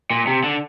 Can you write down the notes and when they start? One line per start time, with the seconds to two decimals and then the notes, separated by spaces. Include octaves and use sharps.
0.10 A#2
0.27 C3
0.44 D3